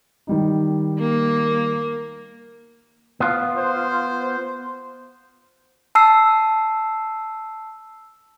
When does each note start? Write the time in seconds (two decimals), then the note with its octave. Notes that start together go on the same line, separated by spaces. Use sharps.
0.27 D#3 G3 D#4
0.99 A#3
3.20 B3 F4
3.57 C5
5.95 A5 E6 C7